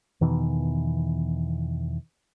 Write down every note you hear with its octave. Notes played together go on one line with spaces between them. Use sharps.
E2 B2 D#3 E3